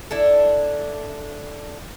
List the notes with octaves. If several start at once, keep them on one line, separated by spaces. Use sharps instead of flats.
D4 E4 A4